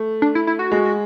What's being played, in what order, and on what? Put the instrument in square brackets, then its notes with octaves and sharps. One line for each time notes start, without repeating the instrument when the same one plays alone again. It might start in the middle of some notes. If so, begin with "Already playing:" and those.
Already playing: [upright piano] A3
[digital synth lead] D4
E4
E4
F#4
[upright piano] G#3